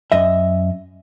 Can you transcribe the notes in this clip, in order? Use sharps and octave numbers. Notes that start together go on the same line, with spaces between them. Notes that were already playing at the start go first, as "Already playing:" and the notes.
F#2 D#5 E5